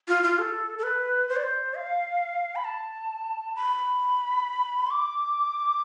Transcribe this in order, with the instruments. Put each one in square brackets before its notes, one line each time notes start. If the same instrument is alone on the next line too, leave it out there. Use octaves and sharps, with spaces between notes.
[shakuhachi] F4
F4
A4
A4
B4
C5
D5
C5
F5
B5
A5
B5
C6
D6